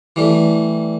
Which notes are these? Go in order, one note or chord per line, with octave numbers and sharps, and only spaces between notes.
E3 G3 A3